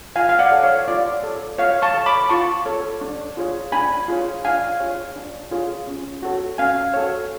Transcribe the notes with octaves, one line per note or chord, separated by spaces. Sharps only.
F4 F5 G#5
F5
D5 F#5
A4 C#5
C#5 F5
F4 D5
A4 C#5
F4 C#5 F5
A5 C#6
A4 C#5
B5 D6
F4 A5 C#6
A4 C#5
D4
F4 G#4 C#5
D4 G#5 B5
F4 G#4 C#5
D4 F5 G#5
F4 G#4 C#5
D4
F4 G#4 C#5
C#4
F#4 A4 C#5
C#4 F5 G#5
F#4 A4 C#5